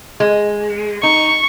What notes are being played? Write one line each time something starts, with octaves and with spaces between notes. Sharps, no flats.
G#3
D#4 C#6